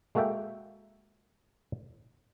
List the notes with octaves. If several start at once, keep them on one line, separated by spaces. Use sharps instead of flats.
G#3 A#3 F#4 A4 E5 G5